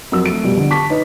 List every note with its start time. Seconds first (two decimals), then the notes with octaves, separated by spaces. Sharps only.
0.12 F2 F#3 A#4 E6
0.26 A3 D7
0.44 B2 G3 G4
0.57 D3
0.70 A5 C#6 D6 B6
0.90 D#4 B4 C#5 D#5